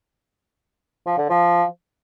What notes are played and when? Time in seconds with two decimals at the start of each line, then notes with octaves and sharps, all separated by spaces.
1.06 F3
1.18 D3
1.30 F3